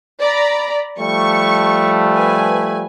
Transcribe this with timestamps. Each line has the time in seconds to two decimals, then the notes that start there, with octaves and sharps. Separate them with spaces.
0.21 D5 A#5 B5
0.99 F3 G3 A3 C#6
2.14 B4 G#5